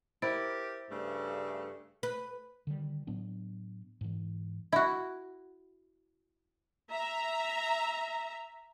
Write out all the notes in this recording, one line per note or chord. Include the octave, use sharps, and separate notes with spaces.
E4 G4 A#4 C5 A6 D7
G2 C#3 A3
B4
D3 D#3 G3
A2 F#3 B3 D4
G#2 E3
E4 F#4
E5 A#5